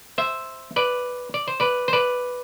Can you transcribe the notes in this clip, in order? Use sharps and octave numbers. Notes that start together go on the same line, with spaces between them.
C5 E5
B4 D5
D5
C5
B4 D5
C5
B4 D5